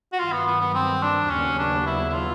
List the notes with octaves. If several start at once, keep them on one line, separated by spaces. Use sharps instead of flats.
F#4
G2 D#3 F#3 F4
B3
B3
B3
C4
D4
D#2 C#3 F#3 B3 C#4
D4
E4
E4
F4